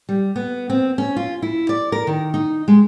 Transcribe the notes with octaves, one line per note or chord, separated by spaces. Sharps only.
G3
B3
C4
C#4
F4
E4
D5
A#4
D#3
D#4
G#3